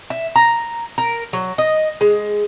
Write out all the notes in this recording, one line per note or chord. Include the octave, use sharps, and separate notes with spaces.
E5
A#5
A#4
F#3
D#5
G#3